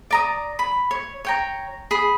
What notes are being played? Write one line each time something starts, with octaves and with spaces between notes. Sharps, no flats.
D5 A#5 D#6
B5
C#5
C#5 G5 A#5
G#4 B5